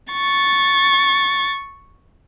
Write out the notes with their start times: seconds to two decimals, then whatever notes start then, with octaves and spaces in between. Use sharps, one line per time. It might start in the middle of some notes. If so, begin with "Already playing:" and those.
0.13 C#6 A6